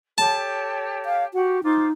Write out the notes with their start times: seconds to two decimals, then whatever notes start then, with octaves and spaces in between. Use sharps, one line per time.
0.18 G4 A4 C#5 A5
1.05 F5
1.34 F#4 G4 F#5
1.63 D#4 F4 C5 D6